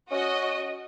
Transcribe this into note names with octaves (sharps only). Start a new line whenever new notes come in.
C#4 F#4 D#5